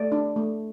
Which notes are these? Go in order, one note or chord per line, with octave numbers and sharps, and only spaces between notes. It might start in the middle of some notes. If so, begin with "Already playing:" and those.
Already playing: A3 D5
D4
A3